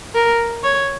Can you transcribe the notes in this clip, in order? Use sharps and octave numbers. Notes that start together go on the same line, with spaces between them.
A#4
C#5